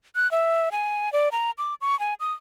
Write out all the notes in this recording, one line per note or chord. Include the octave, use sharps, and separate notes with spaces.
F#6
E5
G#5
D5
A#5
D6
C#6
G#5
D#6